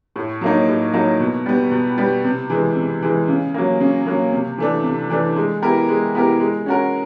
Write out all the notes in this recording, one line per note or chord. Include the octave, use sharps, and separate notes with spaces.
A2
F#3 A#3 D#4
A2
F#3 A#3 D#4
B2
G3 B3
B2
G3 B3
C3
E3 G#3
C3
E3 G#3
C#3
F#3 A#3
C#3
F#3 A#3
C3
E3 A3 D4
C3
E3 A3 D4
G#3
B3 E4 G4 A#4
G#3
B3 E4 G4 A#4
G#3
C#4 F#4 A#4